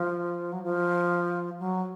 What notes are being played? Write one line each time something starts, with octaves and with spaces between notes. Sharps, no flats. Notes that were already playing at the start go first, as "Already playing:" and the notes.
Already playing: F3
F#3
F3
F#3